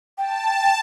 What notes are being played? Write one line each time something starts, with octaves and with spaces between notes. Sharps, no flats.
G5 A5